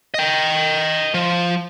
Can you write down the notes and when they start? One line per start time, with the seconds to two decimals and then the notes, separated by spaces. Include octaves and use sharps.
0.14 D#5 G5
1.14 F3